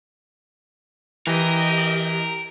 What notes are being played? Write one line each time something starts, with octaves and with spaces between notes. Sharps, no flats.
E3 G4 A#4 D#5